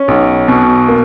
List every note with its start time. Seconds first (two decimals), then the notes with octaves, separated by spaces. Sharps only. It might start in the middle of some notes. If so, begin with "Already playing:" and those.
Already playing: C#4
0.08 B1
0.48 B2
0.88 A#3